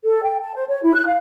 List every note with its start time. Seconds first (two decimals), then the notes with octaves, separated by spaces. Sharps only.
0.05 A4
0.23 G5
0.40 A5
0.55 C5
0.68 C#5
0.82 E4
0.95 F#6
1.06 F5